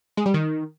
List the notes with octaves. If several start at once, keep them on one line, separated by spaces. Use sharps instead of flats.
G#3
G3
D#3